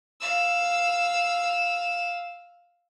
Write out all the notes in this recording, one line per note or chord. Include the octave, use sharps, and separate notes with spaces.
F5 E6